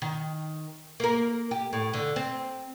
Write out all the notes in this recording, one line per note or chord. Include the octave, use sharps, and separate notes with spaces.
D#3
A#3 A#4
G4
A2
D3
C4